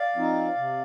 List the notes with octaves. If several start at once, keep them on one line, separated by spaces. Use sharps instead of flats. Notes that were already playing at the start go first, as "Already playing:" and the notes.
Already playing: D5 F5
F3 C4 D#4
C3